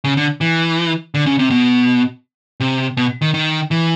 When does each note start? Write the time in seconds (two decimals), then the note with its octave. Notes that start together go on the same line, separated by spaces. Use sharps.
0.04 C#3
0.17 D3
0.41 E3
1.14 D3
1.26 C#3
1.39 C3
1.50 B2
2.60 C3
2.97 B2
3.22 D#3
3.34 D#3
3.71 E3